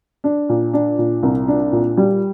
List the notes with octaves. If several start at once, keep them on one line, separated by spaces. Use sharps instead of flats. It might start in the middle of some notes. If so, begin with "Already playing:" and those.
D4
A#2
D4
A#2
C2
D4
A#2
G3